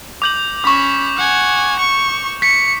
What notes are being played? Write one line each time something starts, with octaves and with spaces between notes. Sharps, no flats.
D6 G6 F#7
C#4 B5 C#6 D6
F#5 G#5
C#6
B6 C#7